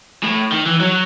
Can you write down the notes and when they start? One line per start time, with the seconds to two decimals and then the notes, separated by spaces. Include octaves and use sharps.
0.23 A2
0.52 D#3
0.66 E3
0.80 F#3